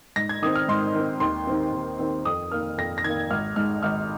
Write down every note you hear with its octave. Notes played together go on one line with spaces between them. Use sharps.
G#2 A#6
G#6
D#3 C4 D#6
F6
G#2 C6
D#3 C4
D#2 C6
D#3 C4
D#2
D#3 C4
F2 D#6
D#3 A#3 F6
F2 A#6
A#6
D#3 A#3 G#6
G#1 F6
G#2 G#3 F6
G#1 F6